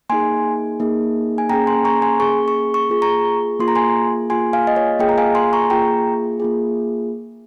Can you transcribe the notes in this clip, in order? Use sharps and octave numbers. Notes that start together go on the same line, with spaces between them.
A#3 D#4 G#4 G#5 C6
A#3 D#4 G#4
G#5
A#3 C#4 G#4 G5 A#5
G#5 C6
A#5 C#6
G#5 C6
A#3 C#4 G#4 C#6
C#6
C#6
A#3 F4 G#4
A#5 C#6
A#3 F4 G#4 C6
A#5
G#5 C6
A#3 F4 G#4 G#5 C6
F5 G#5
D#5
C#5 F5
A#3 F4 G#4 D#5 G5
A#5
F5 G#5
G#5 C6
A#5 C#6
A#3 F4 G#4 G5 A#5
A#3 F4 G#4